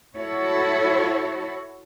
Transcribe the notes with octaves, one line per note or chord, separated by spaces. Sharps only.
E4 F#4 A4 C#5